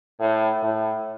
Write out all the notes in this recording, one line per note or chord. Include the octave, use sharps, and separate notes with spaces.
A2
A2